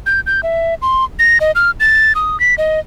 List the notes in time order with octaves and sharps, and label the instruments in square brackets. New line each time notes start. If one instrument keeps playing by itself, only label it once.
[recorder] G6
G6
E5
C6
A#6
D#5
F6
A6
D#6
B6
D#5